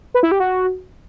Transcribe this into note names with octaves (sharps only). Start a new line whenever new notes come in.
B4
E4
G4
F#4